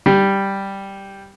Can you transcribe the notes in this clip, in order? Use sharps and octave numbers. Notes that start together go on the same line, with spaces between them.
G3